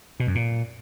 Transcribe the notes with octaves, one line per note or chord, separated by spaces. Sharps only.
B2
F#2
A#2